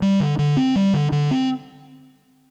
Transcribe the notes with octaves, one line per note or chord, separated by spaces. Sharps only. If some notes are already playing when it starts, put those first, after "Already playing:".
G3
D3
D3
C4
G3
D3
D3
C4